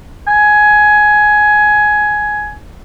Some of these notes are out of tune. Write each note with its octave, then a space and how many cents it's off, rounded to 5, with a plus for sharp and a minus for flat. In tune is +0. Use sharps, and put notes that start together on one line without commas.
G#5 +15